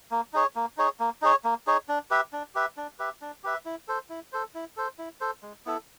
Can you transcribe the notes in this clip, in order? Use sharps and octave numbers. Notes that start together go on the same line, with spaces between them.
A#3
D#4 G#4 C#5
A#3
D#4 G#4 C#5
A#3
D#4 G#4 C#5
A#3
D#4 G#4 C#5
D4
G4 B4 E5
D4
G4 B4 E5
D4
G4 B4 E5
D4
G4 B4 E5
E4
A4 C5
E4
A4 C5
E4
A4 C5
E4
A4 C5
G#3
B3 E4 A4